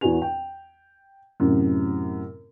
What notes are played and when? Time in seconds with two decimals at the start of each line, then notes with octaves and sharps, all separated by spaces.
0.01 E2 E3 F#4 B4 G#5 F7
0.22 G5
1.40 F#2 A2 C3